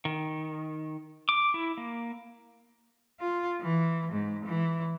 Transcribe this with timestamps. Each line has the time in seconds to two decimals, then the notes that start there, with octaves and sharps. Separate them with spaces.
0.05 D#3
1.29 D6
1.54 E4
1.77 A#3
3.20 F4
3.61 E3
4.12 G#2
4.46 E3